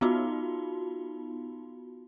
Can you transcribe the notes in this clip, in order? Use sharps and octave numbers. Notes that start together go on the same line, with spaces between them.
B3 D#4 F4 F#4